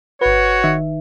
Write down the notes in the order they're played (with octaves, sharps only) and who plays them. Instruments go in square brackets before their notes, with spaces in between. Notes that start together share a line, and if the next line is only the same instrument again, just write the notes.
[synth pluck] G1 B4 [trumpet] F#4 [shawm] C#5
[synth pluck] D#3 D#4 E5